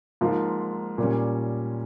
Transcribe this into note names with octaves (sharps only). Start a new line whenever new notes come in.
G#2 F3 A#3 F4
A#2 G3 C#4